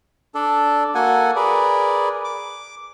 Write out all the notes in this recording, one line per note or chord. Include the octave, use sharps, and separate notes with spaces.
D4 A4 D5
A#3 F#4 A4 F#5 G#5
G#4 A#4 B4 D5
D6